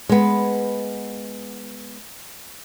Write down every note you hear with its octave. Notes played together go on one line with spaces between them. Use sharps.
G#3 B3